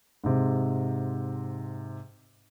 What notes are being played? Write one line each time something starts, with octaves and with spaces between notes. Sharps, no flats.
G#2 C3